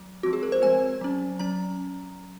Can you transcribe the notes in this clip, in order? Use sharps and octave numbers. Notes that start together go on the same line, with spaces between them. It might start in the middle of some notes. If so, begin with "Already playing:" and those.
Already playing: F#3
F3 G#3 C4 F#4
G#4
A#4
C5
F3 G#3 C4 G#5
F#3 C#4
F#3 C#4 A#5